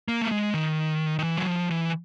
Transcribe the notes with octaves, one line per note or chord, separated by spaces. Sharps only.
A#3
A3
G#3
D#3
D#3
E3
F#3
F3
E3